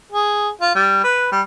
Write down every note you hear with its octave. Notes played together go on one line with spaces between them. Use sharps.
G#4
F4
G3
B4
G3